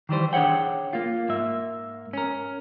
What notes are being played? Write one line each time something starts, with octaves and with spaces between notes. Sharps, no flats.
D#3 E3 G3 C5
D4 G#4 C#5 F#5 G5
A#3 F4
G#2 A#3 E5
C#4 A#4